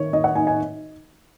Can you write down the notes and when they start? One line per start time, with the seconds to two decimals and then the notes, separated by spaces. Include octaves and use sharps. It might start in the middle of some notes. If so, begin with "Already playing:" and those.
Already playing: D#3 D#4 C#5
0.13 D#4 D#5
0.24 F#5
0.35 D#4 G#5
0.47 G#5